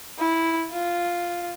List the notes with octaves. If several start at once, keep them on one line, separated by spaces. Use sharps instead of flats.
E4
F4